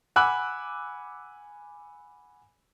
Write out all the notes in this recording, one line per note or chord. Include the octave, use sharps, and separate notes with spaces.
F#5 G#5 B5 D6 E6 F#6